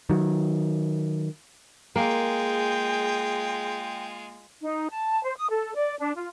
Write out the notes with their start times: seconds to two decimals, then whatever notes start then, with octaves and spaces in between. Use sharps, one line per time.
0.10 D#3 F#3
1.96 G#3 A#3 F4 G#4 G5
4.62 D#4
4.90 A5
5.24 C5
5.36 D#6
5.50 A4
5.75 D5
5.99 D4
6.17 F4